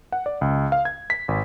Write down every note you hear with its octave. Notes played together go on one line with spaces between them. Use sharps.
F#5
D5
C#2
F5
G#6
B6
G#1